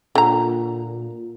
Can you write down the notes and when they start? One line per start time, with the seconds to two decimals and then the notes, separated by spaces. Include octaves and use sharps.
0.15 A#2 D3 A#5